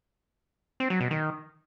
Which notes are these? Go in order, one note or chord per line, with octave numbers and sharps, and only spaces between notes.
C4
F#3
B2
D#3